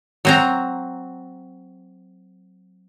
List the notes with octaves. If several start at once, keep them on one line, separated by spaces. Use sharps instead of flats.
F#3 C4 A#5